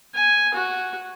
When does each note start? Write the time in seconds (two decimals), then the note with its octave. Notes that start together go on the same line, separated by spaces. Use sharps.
0.14 G#5
0.54 F#4